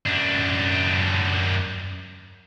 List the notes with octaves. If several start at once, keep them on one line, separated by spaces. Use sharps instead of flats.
F#2 D4